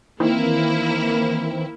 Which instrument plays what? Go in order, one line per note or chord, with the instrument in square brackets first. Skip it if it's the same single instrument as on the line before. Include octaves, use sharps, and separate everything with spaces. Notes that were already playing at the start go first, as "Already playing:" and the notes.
[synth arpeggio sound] D#3 E3 C4 [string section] A#3 E4